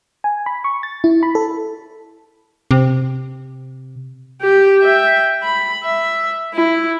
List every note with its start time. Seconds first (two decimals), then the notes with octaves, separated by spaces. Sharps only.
0.24 G#5
0.46 B5
0.64 C#6
0.83 A6
1.04 E4
1.23 B5
1.35 A4
2.71 C3
4.41 G4
4.80 E5 G5
5.43 B5
5.83 E5
6.54 E4